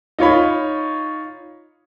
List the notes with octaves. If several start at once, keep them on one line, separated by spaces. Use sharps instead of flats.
D#4 F4 C#5 B5